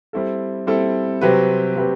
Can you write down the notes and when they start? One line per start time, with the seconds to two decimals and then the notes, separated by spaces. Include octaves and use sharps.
0.13 G3 C4 E4 A4
0.67 G3 C4 E4 A4
1.21 C3 F#3 C4 G4 B4
1.76 C3 F#3 C4 G4 B4